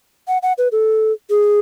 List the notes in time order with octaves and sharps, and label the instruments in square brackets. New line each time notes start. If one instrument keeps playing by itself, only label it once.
[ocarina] F#5
F#5
B4
A4
G#4